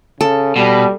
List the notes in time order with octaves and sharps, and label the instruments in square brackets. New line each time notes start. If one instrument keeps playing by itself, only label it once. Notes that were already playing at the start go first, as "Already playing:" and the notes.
[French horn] C#3 [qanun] A4
[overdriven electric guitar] B2 [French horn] G3